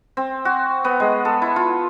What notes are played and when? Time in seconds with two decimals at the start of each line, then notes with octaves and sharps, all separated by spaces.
0.17 C4
0.45 F#4
0.85 B3
1.00 G#3
1.25 A4
1.42 E4
1.56 F4